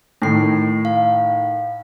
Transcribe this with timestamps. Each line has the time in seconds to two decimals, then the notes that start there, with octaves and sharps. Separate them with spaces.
0.22 A2 D#3 A3 C7
0.85 F5